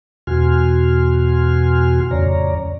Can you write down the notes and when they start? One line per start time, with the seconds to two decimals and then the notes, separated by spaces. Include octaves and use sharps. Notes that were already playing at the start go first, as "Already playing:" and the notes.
0.27 E2 B2 F#4 G#5 C6 F6
2.11 F2 A2 C#3 C#5 D5 A#5